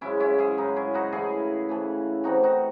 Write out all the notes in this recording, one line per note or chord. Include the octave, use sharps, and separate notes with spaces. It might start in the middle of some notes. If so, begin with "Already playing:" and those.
F#2 C#3 G#3 C#4 E4
C#4 E4
E4 G#4
F#2 C#3 G#3 D#4
C#4 E4
D#4 F#4
C#3 E3 A3 C#4 E4 G#4
C#3 E3 A3 C#4
C3 E3 A3 C4 D#4 F#4
D#4 F#4